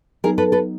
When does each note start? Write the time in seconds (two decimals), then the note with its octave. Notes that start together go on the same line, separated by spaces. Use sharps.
0.24 F#3 B3 D#4 G#4 A#4
0.38 A4 B4
0.52 A4 B4